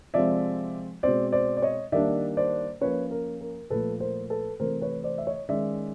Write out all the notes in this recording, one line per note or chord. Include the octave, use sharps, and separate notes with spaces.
C3 F3 G#3 C4 D5 E5
B2 G#3 C4 C5 D5
C5 D5
D5
C#5 D#5
D#3 G3 A#3 D4 D5 E5
C5 D5
F3 A#3 C#4 B4 C#5
A#4
A#4
A#2 F3 A3 A4 B4
A#4 C5
A4 B4
C3 E3 A3 A#4 C5
B4 C#5
C5 D5
E5
C#5 D#5
D#3 G#3 C#4 D5 E5